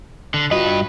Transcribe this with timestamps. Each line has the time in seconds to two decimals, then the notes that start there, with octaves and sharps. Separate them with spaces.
0.34 D3
0.51 G2 F4 F#4 B4 D#5